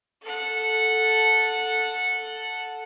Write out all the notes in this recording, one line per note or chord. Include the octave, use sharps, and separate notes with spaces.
A4 F#5